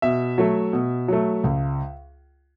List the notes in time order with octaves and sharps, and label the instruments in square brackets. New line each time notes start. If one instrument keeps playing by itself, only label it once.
[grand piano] B2 E5
F#3 A3
B2
F#3 A3
C#2